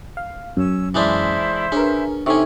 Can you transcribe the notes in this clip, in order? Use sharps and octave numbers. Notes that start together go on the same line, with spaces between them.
F5
F#2 C#4 E6
E3 G#3 D4 E4 C5 E5
C#4 D4 G#4 A#4 B4
C3 C#4 D#4 A4 E5 G#5 C#6